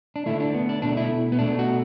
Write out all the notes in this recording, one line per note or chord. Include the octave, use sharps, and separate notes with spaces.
D4
D3 A3 E4
D4
B3
D4
B2 A3 D4
E4
B3
B2 A3 D4
F#4